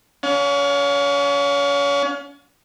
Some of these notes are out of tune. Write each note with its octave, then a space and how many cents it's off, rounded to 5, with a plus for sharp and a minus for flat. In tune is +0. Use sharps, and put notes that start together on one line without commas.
C#4 +30 F5 +40